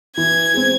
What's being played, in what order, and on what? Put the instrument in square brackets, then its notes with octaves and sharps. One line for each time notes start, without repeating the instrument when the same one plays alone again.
[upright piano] E3 [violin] G#6
[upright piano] G#3 C4